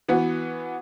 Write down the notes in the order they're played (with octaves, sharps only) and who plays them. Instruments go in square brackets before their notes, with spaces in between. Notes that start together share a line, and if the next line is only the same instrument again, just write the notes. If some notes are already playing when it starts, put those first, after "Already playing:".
[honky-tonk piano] E3 B3 F#4